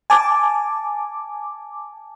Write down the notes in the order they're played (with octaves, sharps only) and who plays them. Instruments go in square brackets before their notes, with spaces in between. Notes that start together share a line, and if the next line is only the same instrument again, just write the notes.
[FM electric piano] G#5 A5 D6